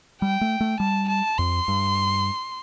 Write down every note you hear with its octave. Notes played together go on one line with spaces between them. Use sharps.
G3 G5
A3
A3
G3 A5
A5
F2 C6
G2